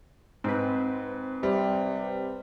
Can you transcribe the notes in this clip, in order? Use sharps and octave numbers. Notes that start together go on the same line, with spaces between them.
G#2 C4 B4
C3 G3